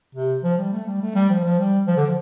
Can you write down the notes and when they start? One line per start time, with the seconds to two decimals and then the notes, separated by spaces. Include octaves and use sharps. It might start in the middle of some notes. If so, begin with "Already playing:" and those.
0.15 C3
0.44 F3
0.58 G3
0.72 A3
0.87 G3
1.02 A3
1.15 G3
1.30 F3
1.44 F3
1.59 G3
1.87 F3
1.97 D3
2.06 F3